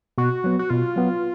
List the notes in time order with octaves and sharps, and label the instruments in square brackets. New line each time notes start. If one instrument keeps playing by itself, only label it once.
[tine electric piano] B2 [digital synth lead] F#4
[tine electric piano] F#3 B3
[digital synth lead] F#4
[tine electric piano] B2 [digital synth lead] F4
[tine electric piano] F#3 B3